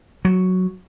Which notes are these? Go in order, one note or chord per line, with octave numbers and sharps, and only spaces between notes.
F#3